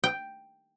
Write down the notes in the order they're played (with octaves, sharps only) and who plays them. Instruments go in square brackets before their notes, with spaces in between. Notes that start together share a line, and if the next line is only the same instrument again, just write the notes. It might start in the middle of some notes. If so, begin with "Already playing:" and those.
[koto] G5